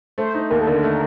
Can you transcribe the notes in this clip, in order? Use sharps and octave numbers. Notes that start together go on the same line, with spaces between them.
A3 C5
D#4
D#2 A#4
A4
D3 A#4
A3